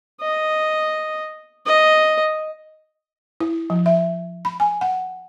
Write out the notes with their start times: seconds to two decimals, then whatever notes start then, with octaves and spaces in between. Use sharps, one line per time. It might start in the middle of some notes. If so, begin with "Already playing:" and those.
0.21 D#5
1.66 D#5
3.41 E4
3.70 F3
3.86 E5
4.45 B5
4.60 G#5
4.81 F#5